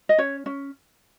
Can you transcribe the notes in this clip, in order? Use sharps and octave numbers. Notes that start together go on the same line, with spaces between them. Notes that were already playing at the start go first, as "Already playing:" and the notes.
D#5
C#4 C#5
C#4